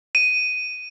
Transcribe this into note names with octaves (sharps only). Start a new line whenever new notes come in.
D#7